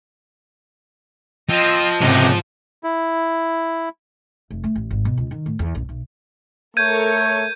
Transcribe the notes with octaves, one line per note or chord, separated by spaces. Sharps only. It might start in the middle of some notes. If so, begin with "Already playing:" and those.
F3 C4 D#5
C#2 G#2 C3 F#4 G4 D#5
E4
F1
A3
A1
G#1
B2
C#2
D#3
A2
E2
A#1
B1
A3 A4 A#4 C#5 G6 G#6 D#7